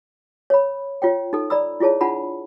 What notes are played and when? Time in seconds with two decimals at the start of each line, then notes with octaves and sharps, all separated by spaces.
0.50 C#5 B5
1.02 F4 C#5 G5
1.33 D#4 A4
1.50 D5 A#5 B5 E6
1.80 E4 F4 G#4 C#5 A5
2.01 D4 F4 F#5 A5 B5